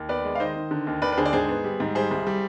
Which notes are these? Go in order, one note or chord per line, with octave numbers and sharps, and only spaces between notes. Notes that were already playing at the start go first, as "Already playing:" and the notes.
Already playing: D#2
B3 B4 D5
G#3
F5
D#3 C5 D#5
D#3
D3
D#2
D#2 B4 D5
B4
D3 G#4 C5
D5
G#2 G#4 C5
B3
G3
G#2
G3 G#4 C5
C2
G3